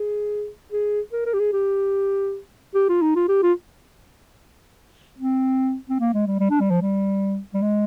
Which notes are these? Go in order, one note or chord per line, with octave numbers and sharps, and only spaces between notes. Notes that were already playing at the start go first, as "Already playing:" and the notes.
Already playing: G#4
G#4
A#4
A#4
G4
G#4
G4
G4
F4
D#4
F4
G4
F4
C4
C4
A#3
G#3
G3
G3
D4
G3
F3
G3
G3
G#3